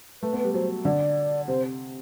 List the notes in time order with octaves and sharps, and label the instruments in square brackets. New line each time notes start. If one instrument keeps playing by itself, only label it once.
[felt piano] A3 [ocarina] B4
[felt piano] B3
[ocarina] B4
[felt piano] G3
[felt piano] F#3 [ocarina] C5
[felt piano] D3 [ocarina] D5
[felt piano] C3 [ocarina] C5